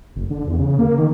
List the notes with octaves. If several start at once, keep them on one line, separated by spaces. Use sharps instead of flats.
F#1
D3
E2
C#3
A#3
D#3